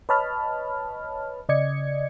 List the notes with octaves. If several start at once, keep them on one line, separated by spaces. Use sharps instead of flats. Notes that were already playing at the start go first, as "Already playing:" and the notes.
B4 C#5 D#5 A5 B5 F6
C#3 D5 D#5 G#6 C#7